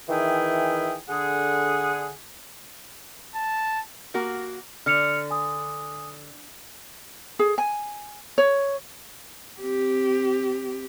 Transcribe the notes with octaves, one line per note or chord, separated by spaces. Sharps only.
D#3 E3 G#4 E5 G5
D3 G#4 F#5
A5
A#3 F#4 A#4
D3 F6 C#7 F7
G#5 D#6
G#4
G#5
C#5
C4 G4